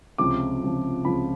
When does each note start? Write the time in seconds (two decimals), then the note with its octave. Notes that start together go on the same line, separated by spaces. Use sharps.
0.18 C#2 C3 F3 D6
0.62 C#2 C3 F3
1.05 C#2 C3 F3 B5